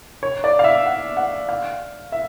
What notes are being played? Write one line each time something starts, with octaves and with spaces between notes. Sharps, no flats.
C#5
D5
F5
E5
F#5
F#5
F5
E5